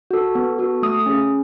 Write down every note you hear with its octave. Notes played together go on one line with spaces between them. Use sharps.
F#4 A4
B3
F#4 A4
A3 D#6
C#4 G#4